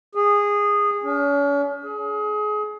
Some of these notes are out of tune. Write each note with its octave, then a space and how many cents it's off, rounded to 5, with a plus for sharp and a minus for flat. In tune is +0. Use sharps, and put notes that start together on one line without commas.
G#4 -15
C#4 +40
G#4 +25